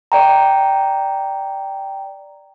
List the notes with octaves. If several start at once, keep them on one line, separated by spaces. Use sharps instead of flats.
D5 G5 A#5